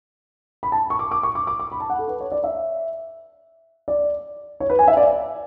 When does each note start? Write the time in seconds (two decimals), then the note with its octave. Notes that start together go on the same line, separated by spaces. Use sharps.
0.63 B5
0.72 A5
0.90 C#6
0.99 D6
1.11 D6
1.23 C#6
1.35 D6
1.47 D6
1.60 D6
1.72 B5
1.80 A5
1.90 F#5
1.98 A4
2.08 B4
2.20 C#5
2.32 D5
2.44 E5
3.88 D5
4.60 C#5
4.70 B4
4.79 G#5
4.87 E5
4.97 D5